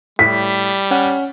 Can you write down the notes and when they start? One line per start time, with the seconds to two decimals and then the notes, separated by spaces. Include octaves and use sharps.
0.19 A2 G3 B6
0.91 C#4 F#5